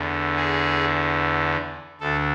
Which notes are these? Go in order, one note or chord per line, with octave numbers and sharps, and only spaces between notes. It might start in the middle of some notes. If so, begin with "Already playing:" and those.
Already playing: E2 D3
G#4
D2 D3 A4